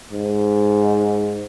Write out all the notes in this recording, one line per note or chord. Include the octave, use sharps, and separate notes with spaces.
G#2